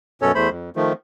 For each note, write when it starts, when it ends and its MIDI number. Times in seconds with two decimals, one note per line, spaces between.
0.22 0.32 42
0.22 0.32 47
0.22 0.32 61
0.22 0.32 69
0.22 0.32 73
0.35 0.50 40
0.35 0.50 57
0.35 0.50 72
0.35 0.50 83
0.50 0.70 41
0.76 0.93 51
0.76 0.93 53
0.76 0.93 57